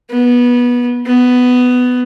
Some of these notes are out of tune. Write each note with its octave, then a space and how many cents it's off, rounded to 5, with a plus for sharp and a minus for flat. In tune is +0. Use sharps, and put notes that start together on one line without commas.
B3 -20
B3 +10